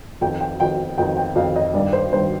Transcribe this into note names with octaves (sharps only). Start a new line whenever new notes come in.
F2 D#3 G5
G5
F2 D#3 G5
F2 D#3 G5
G5
F2 D#3 F5
D#5
G2 D#3 D5
C5
G2 D#3 C5